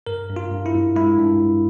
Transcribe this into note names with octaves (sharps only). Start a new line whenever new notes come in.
G2 A#4
G2
F4
G2
E4
G2
G#3 E4
G2
G2